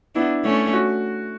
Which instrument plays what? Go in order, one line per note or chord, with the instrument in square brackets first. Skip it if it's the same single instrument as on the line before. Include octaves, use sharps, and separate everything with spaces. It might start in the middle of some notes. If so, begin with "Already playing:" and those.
[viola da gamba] B3 D4 [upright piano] E4
[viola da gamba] A3 C#4
[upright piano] F#4